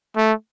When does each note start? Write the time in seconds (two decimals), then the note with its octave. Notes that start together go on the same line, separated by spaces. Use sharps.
0.17 A3